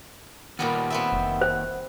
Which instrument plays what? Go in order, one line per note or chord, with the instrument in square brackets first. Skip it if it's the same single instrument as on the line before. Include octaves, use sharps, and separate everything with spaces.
[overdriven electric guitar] D#2 [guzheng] A#2 G3 B3
[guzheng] B3 C4 E5
[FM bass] F1
[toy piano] C5